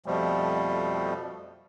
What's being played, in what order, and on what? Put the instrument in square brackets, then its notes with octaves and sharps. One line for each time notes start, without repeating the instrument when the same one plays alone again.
[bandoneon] F2 B2 F3 G3 A3